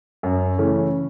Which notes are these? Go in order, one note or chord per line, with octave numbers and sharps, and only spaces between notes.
F#2
C#3 E3 A3 C#4